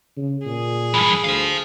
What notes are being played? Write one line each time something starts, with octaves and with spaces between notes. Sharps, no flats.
C#3
A#2 G#4
G2 E3
D2 C5 F5